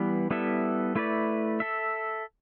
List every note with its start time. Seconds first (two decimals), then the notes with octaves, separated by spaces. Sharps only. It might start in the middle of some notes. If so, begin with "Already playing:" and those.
Already playing: E3 G3 B3 E4
0.31 G3 B3 E4 A4 E5
0.95 A3 E4 B4 D5
1.60 A4 E5